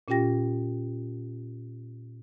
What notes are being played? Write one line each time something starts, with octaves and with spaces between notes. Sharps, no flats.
A#2 C#4 F4 G4 G5 A#6